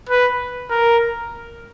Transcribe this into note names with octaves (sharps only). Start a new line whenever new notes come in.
B4
A#4